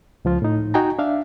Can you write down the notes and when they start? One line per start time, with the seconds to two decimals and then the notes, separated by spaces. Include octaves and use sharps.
0.25 C#2 F3 F4
0.42 A2 D#4
0.74 D#4 F#4 G5 G#5 A#5
0.99 D4 E5 F5